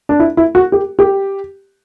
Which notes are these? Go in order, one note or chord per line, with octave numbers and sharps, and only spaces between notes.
D4
E4
E4
F#4
G4
G4